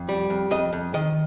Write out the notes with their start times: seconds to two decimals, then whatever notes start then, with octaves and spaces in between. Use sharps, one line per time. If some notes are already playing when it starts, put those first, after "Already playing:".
Already playing: F2
0.09 G3
0.30 F2
0.51 F2 D#5
0.73 F2
0.94 D#3 D#5